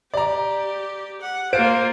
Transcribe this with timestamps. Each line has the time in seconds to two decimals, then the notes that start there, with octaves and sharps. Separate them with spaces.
0.14 G4 D5 A#5
1.21 F#5
1.53 A#3 F4 C5 F5 D7